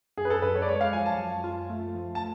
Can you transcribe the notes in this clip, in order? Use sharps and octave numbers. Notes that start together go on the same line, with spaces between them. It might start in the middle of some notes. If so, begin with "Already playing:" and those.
F#2 G#4
B4
A4
F#2 B4
C#5
D5
G#3 C#5
F5
F3 G#5
A5
F#2
F4
A3
F3
A5